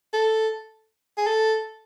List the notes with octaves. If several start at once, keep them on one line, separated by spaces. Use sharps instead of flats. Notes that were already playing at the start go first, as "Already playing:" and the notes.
A4
G#4
A4